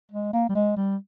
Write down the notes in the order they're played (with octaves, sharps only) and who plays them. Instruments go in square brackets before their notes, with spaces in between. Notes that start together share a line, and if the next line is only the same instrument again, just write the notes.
[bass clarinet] G#3
A#3
G3
G#3
G3